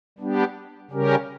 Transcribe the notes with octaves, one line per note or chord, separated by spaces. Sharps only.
G3 B3 D4 G4
C#3 G3 C#4 G4 A#4